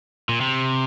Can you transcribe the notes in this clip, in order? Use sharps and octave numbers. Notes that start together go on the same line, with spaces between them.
A#2
C3